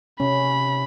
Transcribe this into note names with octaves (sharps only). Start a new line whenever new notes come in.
C3 C#4 B5